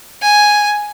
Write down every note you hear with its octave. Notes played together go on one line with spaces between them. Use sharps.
G#5